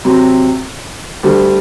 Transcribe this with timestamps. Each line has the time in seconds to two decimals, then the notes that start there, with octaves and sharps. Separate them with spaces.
0.05 C3 F#3 C4
1.23 D2 D3 G3